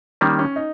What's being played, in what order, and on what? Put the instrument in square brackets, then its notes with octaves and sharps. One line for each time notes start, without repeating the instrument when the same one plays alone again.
[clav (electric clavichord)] D#3 G3 A#3 [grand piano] C#4
[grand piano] C#4
D#4